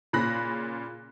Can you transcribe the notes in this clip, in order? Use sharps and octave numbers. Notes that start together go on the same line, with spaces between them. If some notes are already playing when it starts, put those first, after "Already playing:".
A#2 C#3 B5 F#6 A#6